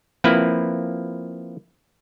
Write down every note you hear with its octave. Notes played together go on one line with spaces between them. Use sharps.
F3 A#3 C4 E4 B4